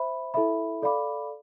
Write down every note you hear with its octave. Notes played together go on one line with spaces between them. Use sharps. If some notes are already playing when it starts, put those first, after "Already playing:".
Already playing: C5 E5 B5
E4 A4 E5 B5
A4 D5 F5 B5 D6